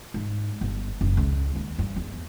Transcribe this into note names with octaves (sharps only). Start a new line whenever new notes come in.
G#2
G1
F#1
C#2
D#2
G2
E2